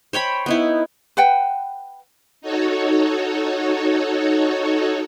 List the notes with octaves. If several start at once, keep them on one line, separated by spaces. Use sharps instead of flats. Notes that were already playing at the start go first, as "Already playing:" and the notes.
C5 C#5 G5 B5
B3 D#4 E4
B4 F#5 G5
D#4 F#4 A4 C#5